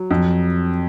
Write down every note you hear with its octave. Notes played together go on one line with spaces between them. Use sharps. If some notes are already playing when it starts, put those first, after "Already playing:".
Already playing: F#3
F2